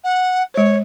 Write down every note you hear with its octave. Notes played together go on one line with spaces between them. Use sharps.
F#5
G#3 C5 C#5